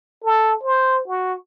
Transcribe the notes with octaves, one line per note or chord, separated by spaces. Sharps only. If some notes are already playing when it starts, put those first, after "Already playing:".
A4
C5
F#4